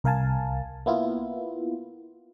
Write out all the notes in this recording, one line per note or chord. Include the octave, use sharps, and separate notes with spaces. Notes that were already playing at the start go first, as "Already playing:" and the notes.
C2 A#4 F5 G#5 A5
A#3 B3 E4 F4